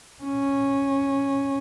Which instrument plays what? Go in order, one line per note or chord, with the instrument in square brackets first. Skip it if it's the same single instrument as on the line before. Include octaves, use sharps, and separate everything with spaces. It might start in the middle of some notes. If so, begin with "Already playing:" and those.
[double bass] C#4